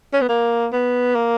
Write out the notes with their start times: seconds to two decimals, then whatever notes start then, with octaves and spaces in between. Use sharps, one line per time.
0.13 C#4
0.21 B3
0.29 A#3
0.73 B3
1.15 A#3